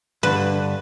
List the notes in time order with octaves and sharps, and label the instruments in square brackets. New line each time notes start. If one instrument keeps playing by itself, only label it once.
[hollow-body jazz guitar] G2 D3 D4 [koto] B4